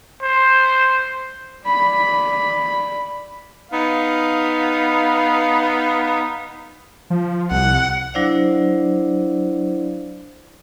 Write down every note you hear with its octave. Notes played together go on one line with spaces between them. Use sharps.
C5
D5 B5
B3 D#4 F5
F3
C2 F#5
F#3 D4 E4 C5 D5 F5